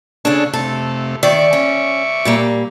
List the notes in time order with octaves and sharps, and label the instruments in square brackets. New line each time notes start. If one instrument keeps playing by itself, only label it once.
[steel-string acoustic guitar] C#3 D4 [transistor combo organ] G#4 A4 C#5
[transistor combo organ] C3 A3 [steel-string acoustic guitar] A4
[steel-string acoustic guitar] D#3 D5 [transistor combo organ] E5 C#6 D6
[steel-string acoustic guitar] C#4
A#2 G3 A#3